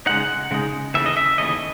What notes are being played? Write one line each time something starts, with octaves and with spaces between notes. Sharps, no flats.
C#3 G#3 D#4 F#5
C#3 G#3 D#4
D#2 C#3 E3 A3 E5
D#5
E5
D#2 C#3 E3 A3 D#5